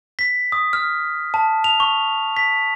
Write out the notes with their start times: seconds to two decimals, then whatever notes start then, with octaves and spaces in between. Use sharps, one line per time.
0.19 B6
0.52 D#6
0.73 F6
1.34 A5
1.64 F7
1.80 C#6
2.37 B6